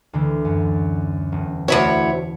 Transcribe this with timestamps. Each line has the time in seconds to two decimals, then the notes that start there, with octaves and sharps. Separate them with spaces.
0.13 D2 D3 E3
0.45 F#2
1.32 E1
1.68 D2 E4 C#5